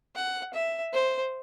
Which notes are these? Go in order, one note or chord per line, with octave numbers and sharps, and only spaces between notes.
F#5
E5
C5